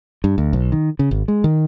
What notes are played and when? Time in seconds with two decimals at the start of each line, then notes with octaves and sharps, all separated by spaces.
0.24 G2
0.38 D2
0.53 B1
0.72 D#3
0.99 C#3
1.11 G#1
1.28 G#3
1.44 D#3